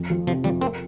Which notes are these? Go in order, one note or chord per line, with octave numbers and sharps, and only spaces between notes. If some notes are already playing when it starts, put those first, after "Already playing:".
Already playing: F2
F3
C3 F3
F2 G3
C4 A#4